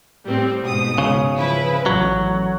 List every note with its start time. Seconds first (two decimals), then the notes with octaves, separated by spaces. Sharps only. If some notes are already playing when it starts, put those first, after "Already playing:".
0.25 A2 G3 C4
0.61 G#2 B2 D#6
0.98 C#3
1.37 F3 E4 B4
1.86 A1 F#3